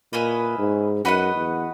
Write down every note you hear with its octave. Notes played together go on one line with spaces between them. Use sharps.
A#2 C#4 E4 B4 D#5
G#2
F#2 F#4 B4 D#5 F#5
E2